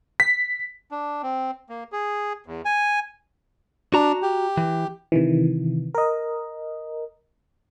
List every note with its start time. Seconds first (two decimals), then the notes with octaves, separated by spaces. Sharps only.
0.20 B6
0.91 D4
1.23 C4
1.69 A#3
1.92 G#4
2.46 E2
2.65 G#5
3.94 D4 F#4 A#5
4.23 G4
4.57 E3
5.12 C3 D#3 E3
5.94 A#4 D#5